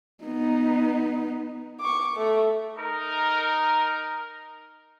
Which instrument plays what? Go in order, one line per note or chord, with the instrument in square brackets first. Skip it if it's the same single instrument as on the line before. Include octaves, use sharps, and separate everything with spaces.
[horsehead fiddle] B3 D#4
[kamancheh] C#6 D6
A3
[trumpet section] D#4 A#4